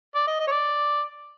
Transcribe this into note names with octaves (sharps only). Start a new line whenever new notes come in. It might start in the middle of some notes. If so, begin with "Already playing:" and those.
D5
D#5
D#5
C#5
D5